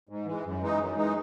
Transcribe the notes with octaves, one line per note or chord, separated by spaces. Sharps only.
G#2
E3 G#3
F#2
E3 G#3 D#4
F#2
E3 G#3 D#4